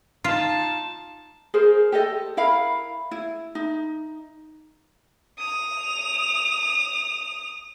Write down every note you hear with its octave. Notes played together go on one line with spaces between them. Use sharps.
D#4 F4 A5
G#4 A#4 C5
G4 A4 D#5
E4 A#4 F5 B5
E4
D#4
D#6 F7